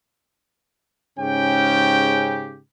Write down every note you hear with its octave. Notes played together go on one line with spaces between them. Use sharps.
G#2 C#3 C#4 G4 G5